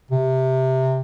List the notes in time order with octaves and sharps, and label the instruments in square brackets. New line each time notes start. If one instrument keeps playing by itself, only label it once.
[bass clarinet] C3